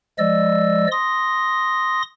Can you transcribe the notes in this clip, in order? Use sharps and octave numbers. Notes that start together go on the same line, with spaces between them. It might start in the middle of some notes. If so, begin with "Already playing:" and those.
F3 G#3 D5 D#5 E6
C6 D#6 A#6